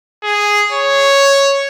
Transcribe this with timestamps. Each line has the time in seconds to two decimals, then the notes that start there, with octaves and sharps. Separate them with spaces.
0.24 G#4
0.72 C#5